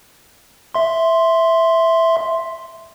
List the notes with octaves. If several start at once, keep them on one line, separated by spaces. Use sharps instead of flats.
E5 C6